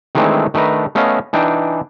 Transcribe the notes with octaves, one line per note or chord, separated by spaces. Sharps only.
D#3 E3 G#3 A3 C4 D4
D#3 A3 D4 B4 A#5
A3 B3 C#4 D#5 F5
E3 D4 D#4 G5